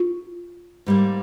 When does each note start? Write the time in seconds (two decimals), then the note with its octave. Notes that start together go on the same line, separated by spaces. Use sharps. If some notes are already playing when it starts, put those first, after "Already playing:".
Already playing: F4
0.86 G#2 G3 A#3